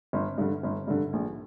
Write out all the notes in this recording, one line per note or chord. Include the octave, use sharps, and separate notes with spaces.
G1
G2 D3
G1
G2 D3
A#1